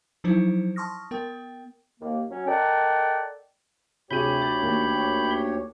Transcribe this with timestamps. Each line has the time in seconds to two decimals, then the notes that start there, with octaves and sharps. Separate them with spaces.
0.24 F3 F#3 D#4 E4 C5
0.76 A5 C6 C#6 D#6 F6 A#6
1.11 B3 A#4 G5
2.00 D#2 A#3
2.30 F#3 C#4
2.47 A4 A#4 D5 D#5 F#5 G5
4.11 D2 C3 G4 G#4 C#5 B5 G6 D#7
4.42 A6
4.62 D#2